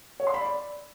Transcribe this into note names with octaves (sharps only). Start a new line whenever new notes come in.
C#5
C6
B5
D5